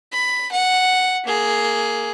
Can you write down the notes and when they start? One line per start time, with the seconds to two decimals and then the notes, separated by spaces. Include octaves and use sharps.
0.12 B5
0.51 F#5
1.25 A#3 G#4